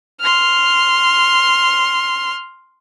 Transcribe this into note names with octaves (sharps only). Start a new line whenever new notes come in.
C6 F6